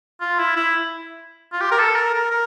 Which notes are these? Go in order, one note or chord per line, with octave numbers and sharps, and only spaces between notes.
F4
E4
E4
F4
G4
A#4
A4
A#4
A#4
A#4